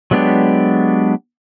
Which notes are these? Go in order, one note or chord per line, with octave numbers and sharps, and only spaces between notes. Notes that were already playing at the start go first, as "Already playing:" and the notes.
F#3 G#3 B3 D4 G4